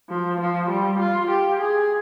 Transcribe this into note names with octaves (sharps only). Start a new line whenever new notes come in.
F3
F3
G3
F4
G4
G#4